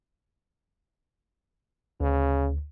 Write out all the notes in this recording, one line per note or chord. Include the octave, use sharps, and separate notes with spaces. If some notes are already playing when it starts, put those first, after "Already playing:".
D2 C#3